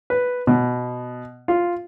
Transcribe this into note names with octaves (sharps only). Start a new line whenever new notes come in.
B4
B2
F4